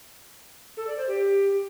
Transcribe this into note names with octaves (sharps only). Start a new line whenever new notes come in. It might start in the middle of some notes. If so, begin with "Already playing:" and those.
A4
D5
C5
G4